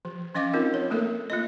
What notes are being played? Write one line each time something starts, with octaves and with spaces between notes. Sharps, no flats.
F3
F3 C#4 D#5 F5 D6
C4 D#4 F4 A#4
C#5
A3 A#3 A4 A#4
A#3 F4 D#5